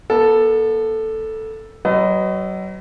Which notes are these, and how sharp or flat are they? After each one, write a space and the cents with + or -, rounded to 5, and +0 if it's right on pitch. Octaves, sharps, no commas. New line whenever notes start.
B3 -45 A4 +0
F#3 +35 B4 +40 D#5 +0